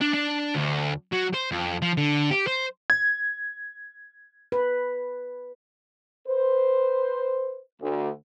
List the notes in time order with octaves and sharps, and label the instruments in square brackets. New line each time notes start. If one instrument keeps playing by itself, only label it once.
[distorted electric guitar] D4
D4
D2
F#3
C5
F2
F3
D3
G4
C5
[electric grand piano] G#6
[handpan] B4
[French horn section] B4 C5
D2